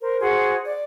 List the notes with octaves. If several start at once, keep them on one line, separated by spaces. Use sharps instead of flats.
A#4 C5
F#4 G#4 C5 C6
D5